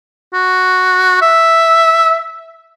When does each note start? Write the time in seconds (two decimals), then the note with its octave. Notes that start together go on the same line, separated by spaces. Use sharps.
0.34 F#4
1.22 E5